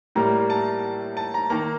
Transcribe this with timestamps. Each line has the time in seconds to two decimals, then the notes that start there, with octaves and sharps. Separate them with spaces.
0.15 A2 G3 A#3 A#5
0.50 A5
1.17 A5
1.34 A#5
1.50 D#3 A#3 A#5